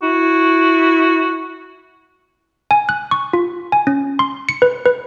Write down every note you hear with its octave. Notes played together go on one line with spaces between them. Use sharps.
E4 F#4
G#5
F#6
C#6
F4
G#5
C#4
C6
C#7
B4
B4